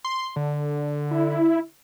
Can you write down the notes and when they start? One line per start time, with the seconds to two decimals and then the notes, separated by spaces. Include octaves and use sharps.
0.05 C6
0.36 D3
1.11 E4